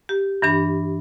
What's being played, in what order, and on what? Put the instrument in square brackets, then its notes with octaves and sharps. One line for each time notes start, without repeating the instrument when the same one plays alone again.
[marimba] G4
G2 E3 D4 B5